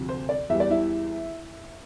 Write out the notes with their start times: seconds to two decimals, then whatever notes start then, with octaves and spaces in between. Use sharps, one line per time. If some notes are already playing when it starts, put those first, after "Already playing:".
Already playing: D2 C3 F3
0.09 C5
0.29 D5
0.49 E2 E3 G3 E5
0.60 D5
0.71 E4 E5